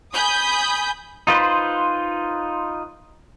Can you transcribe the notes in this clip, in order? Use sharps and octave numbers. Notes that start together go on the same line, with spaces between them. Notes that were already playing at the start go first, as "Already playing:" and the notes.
G#5 B5 D#6 G6
D#4 F4 B4 C5